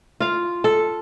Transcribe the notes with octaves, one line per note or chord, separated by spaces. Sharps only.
F4 F5
A4